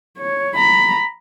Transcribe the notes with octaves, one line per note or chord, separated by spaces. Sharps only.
C#5
A#5 B5